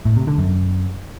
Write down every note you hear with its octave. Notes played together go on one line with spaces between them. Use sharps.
A2
C3
D3
F#2